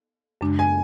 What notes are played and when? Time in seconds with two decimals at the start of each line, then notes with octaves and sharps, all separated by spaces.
0.41 F#2 C#3 G#3 D4
0.59 G#5